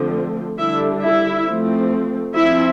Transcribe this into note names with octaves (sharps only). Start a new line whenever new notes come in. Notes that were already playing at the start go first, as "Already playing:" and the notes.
Already playing: D3 F3 A3 C4
D3 G3 D4 E4 E5
E4 E5
F3 A3 C4
F3 C4 E4 E5